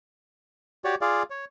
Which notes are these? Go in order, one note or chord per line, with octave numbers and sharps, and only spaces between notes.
F#4 G4 C#5 D5
F4 G#4 D5 F5
C#5